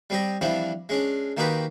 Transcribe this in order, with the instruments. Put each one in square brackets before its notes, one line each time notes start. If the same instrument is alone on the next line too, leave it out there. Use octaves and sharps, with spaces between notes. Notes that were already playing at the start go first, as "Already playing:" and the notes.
[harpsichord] G3 C4 G4 D#5
E3 F3 G3 C4 D4
G#3 C#4 D4
D#3 A#3 D#4 F#4 G4 B4